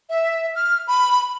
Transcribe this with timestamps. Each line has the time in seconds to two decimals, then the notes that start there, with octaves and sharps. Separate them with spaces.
0.10 E5
0.56 F6
0.87 B5